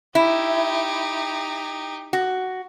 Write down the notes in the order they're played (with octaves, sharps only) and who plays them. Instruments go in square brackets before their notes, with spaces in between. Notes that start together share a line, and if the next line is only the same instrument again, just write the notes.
[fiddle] D#4 G4 [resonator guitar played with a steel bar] E4
[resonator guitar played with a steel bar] F#4